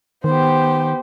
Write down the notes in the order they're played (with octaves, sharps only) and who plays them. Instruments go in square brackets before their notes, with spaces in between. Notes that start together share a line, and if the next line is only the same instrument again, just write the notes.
[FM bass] D#3 [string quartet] B3 G4 [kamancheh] C5